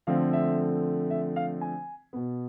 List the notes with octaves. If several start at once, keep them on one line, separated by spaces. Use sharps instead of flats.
D3 F3 A3 C4 F5
E5
E5
F5
G#5
B2 B3